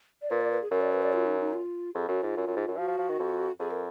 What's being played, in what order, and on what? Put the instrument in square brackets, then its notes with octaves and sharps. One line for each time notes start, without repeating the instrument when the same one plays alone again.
[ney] D5
[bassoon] A#2 [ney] B4
[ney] D5
B4
G#4
[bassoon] F#2 [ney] A#4
[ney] D5
B4
D5
F4
D#4
D#4
F4
[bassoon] F2 [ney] G#4
[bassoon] F#2 [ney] F#4
[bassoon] G#2 [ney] F4
[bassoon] F#2
F#2
G#2
F#2
[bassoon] F3 [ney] F#4
[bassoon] F3
F3
D#3
F2
[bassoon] F2 [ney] G#4
[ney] A#4